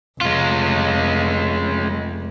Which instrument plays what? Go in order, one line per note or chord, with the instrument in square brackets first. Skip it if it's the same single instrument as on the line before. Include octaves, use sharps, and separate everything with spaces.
[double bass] F1 [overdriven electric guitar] G#3 F4